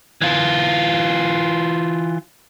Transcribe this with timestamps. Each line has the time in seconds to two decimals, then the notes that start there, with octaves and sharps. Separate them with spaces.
0.22 E3 F4